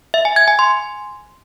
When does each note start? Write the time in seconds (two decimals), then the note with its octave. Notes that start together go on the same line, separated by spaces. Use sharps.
0.14 E5
0.25 G#5
0.36 G#6
0.48 G#5
0.59 C6